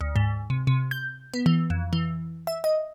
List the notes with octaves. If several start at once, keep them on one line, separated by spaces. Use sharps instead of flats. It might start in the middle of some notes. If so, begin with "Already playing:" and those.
D2
G#2
C3
C3
G6
B3
E3
F2
E3
E5
D#5